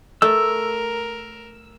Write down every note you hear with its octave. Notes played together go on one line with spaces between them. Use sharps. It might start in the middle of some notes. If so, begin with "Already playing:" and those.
A3 A#4 E6